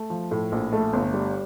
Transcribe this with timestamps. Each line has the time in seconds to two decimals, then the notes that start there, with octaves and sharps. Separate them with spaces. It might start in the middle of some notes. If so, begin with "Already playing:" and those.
Already playing: A3
0.10 F3
0.31 A2
0.52 A#1
0.72 A3
0.93 G1
1.14 G3